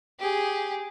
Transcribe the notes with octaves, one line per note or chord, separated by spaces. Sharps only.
G4 G#4